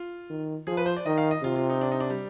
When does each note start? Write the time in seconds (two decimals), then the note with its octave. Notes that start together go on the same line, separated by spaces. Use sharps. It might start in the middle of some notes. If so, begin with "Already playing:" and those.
Already playing: F4
0.30 D#3
0.67 F3 G#4
0.77 B4
0.86 C5
0.96 D5
1.06 D#3 D#5
1.18 F5
1.31 D#5
1.43 C3 F4
1.56 F4
1.69 D#4
1.81 D4
1.91 D#4
2.00 D4
2.10 G3